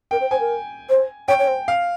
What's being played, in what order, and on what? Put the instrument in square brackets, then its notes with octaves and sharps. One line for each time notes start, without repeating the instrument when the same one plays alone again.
[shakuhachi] A#4 [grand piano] G5
[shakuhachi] C5
[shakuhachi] C5 [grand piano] G#5
[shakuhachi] A#4
C5
[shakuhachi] C#5 [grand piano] G5
[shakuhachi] C#5
C5
[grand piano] F5